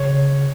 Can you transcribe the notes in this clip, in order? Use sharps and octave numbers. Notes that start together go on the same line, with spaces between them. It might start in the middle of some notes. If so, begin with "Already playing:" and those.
Already playing: C#3 C#5